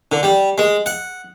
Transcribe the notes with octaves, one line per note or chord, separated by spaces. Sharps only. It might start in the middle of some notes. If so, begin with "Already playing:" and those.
D3
G3
G#3
F#5